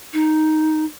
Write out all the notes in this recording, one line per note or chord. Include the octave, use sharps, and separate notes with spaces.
D#4